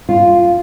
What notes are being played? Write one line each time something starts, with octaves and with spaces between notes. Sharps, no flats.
F4